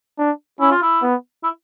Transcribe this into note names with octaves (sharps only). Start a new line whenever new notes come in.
D4
C#4 E4
F4
E4
B3
E4